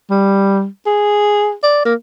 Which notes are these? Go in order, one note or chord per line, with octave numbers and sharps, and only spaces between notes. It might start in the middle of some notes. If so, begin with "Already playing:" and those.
G3
G#4
D5
A#3